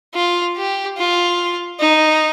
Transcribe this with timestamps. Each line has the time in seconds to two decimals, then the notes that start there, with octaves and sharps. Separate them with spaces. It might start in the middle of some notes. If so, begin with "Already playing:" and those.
0.15 F4
0.57 G4
0.97 F4
1.80 D#4